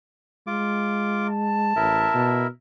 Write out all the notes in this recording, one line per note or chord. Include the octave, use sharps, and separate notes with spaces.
G#3 F4 D6
A5
A1 E4 A#4 E5
B2